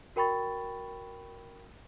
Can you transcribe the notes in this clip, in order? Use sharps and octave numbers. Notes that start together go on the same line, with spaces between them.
F#4 A#4 G5 B5 C#6 A6